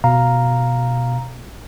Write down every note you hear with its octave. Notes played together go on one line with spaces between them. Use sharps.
B2 F5 A#5